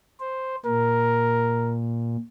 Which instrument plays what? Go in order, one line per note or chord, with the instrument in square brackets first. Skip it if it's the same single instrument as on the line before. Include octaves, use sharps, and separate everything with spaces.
[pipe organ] C5
[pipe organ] A#2 [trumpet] A#4